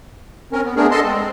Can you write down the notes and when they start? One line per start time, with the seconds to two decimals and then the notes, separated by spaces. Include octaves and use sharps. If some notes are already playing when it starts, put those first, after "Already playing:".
0.52 C4 C#4 A#4
0.65 B3
0.76 A3 B3 D4 G#4 A#4
0.91 A4 D#5 A5 C6
1.05 G#3 C4